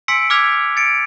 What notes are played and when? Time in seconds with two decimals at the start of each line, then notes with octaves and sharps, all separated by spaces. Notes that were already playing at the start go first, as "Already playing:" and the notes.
0.08 G#5 C6 E6 B6 C#7 D7
0.30 D6 E6 F6 G#6 B6 F7
0.77 A6 C#7 D7